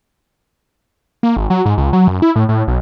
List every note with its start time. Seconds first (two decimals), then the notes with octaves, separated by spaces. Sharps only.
1.23 A#3
1.37 G#1
1.50 F#3
1.65 G#2
1.78 C#2
1.93 F#3
2.08 F#2
2.22 E4
2.36 A2
2.49 A2
2.68 B1